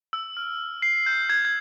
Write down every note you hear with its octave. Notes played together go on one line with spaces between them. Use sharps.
E6
F6
C7
G6
G#6
G#6